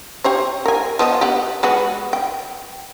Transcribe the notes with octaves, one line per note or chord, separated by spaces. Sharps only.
G4 C5 C#5
A#4 G#5
F3 B3 D#5
G4 F#5
G#3 B3 F#4
G5